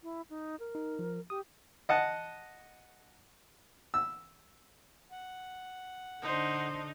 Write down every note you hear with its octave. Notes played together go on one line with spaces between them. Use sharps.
E4
D#4
A#4
D#4
F3
G4 D#6
D#5 F#5 A5
E6
F#5
D3 D4 D#4 C5